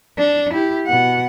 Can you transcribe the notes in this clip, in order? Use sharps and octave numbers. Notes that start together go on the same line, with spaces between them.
D4
E4 G4
B2 F#5